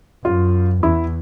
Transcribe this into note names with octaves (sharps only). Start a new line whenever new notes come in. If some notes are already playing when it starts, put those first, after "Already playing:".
F#2 F4
E2 E4